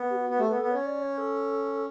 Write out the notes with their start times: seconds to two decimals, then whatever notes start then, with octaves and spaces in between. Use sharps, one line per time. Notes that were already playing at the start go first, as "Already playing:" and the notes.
Already playing: B3
0.10 G4
0.15 F#4
0.29 B3 F#4
0.39 A3 G4
0.47 B4
0.51 B3
0.54 A4
0.62 B3
0.71 C#4 C#5
0.86 D5
1.02 C#5
1.18 A4